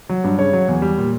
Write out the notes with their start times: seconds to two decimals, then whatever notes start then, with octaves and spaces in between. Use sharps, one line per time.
0.09 F#3
0.24 G2
0.38 C#3 C#5
0.53 F#3
0.69 E2
0.82 G3
0.98 A#2